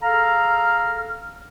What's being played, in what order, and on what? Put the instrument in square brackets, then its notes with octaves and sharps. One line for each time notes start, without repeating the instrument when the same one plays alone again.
[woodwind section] G#4 A4 F5 A#5 F6